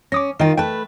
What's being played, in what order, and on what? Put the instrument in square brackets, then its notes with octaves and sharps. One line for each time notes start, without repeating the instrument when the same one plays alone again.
[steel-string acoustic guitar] C#4 [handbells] D6 D#6 A#6
[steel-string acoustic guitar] D#3 F4 [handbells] A#4 D#5 G5
[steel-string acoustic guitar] A3 B4 [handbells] G5 A5